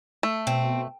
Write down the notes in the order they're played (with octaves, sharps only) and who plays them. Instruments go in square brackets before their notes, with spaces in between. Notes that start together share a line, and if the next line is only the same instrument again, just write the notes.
[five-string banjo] A3
[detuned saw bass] B2 [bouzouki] C4